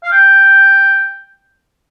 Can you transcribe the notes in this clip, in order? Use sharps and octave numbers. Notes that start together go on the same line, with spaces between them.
F5
G5